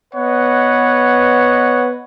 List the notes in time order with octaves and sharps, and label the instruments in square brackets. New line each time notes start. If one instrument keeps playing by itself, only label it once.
[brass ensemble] B3 B4 C#5 D#5 F#5